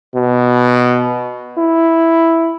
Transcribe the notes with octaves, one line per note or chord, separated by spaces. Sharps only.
B2
E4